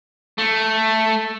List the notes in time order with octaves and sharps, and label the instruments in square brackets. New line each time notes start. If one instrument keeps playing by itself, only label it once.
[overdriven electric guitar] A3